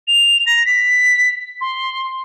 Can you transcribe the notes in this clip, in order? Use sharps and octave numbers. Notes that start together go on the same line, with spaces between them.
F7
A#6
B6
C6